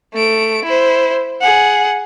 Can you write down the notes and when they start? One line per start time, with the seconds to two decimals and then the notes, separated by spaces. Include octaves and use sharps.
0.14 A3 D7
0.65 E4 C5
1.42 G#4 F#5